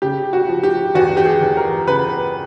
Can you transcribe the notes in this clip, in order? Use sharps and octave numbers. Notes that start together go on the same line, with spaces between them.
C#3 G4
F#4
F3
G4
E2 F#4
G4
G#4
E2
A#4
C#3 B4